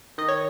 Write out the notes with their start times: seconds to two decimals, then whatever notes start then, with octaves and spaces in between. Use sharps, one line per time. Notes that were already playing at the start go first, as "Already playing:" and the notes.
0.18 D#3 D#5
0.28 C#5